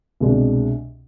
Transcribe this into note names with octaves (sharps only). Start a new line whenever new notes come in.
C2 B2 G#3 D4